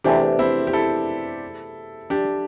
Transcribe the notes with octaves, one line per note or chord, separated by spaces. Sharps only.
E2 C3 E3 A3 D4 G4
C4 E4
G4
E4 A4
D4 G4